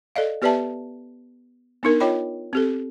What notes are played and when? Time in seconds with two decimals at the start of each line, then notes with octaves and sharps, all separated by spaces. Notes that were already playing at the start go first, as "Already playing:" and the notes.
0.16 A4 D5 D#5 F5
0.42 B3 G4 B4 D5 E5 A5
1.83 B3 D4 D#4 A#4
2.00 F4 C#5 D#5 G5 B5
2.53 C4 G4 A4